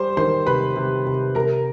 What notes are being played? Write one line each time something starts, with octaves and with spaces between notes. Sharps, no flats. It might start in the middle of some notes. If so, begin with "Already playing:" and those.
Already playing: G3 C5 C6
D#3 C5 C6
C3 B4 B5
C3
C3
C3 A#4 A#5